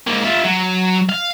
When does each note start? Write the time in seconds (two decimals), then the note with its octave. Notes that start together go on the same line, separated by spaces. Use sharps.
0.07 G#2 A#3
0.24 F4 E5
0.44 F#3
1.09 F5